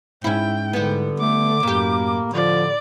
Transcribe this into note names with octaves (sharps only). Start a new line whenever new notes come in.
G#2 C#4 E4 G5
D3 G3 B3
A3 D6
F#2 A2 A#3 G4
D3 F3 D5